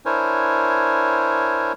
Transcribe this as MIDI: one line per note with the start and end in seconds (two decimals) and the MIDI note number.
0.05 1.73 62
0.05 1.73 64
0.05 1.73 70
0.05 1.73 72
0.05 1.73 73
0.05 1.73 80